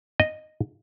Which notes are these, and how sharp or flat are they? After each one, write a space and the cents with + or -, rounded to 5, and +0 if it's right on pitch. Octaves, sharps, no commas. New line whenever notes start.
D#5 -5